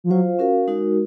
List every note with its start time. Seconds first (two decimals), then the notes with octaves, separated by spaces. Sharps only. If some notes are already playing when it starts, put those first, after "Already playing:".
0.04 F3
0.10 F#3 F4 C5 F5
0.39 C#4 F#4 A#4 F5
0.68 G#3 D#4 F#4 A#4